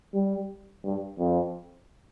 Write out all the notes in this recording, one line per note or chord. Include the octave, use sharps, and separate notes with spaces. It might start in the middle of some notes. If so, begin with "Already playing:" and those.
G3
G2
F2